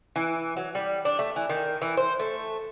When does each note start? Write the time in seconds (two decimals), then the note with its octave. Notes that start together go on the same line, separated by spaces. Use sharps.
0.16 E3
0.57 F#3
0.75 G3
1.05 D4
1.19 A3
1.36 E3
1.49 D#3
1.82 E3
1.97 C5
2.20 A3